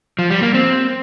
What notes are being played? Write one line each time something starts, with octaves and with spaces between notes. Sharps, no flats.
F3
G3
A#3
C4